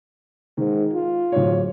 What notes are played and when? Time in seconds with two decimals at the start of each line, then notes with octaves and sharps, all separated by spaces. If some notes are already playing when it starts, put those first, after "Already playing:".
0.58 G#2 D#3
0.93 F4
1.32 D1 C#5